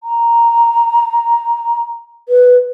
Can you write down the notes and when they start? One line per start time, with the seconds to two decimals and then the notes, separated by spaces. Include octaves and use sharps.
0.04 A#5
2.29 B4